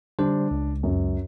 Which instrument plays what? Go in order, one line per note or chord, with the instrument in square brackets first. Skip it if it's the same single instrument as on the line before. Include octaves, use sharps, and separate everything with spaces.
[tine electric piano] D3 G3 C5 [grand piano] D4
[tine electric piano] C#2
[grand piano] F#2